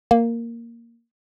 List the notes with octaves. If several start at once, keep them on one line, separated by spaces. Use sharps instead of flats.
A#3